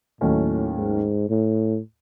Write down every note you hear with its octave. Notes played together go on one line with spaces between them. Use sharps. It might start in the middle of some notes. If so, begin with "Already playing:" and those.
D#2 A2 D#3 F#3 A3 C#4
G#2
A2